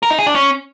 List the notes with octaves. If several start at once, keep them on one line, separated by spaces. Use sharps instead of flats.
A#4
D#4
G#4
D4
C#4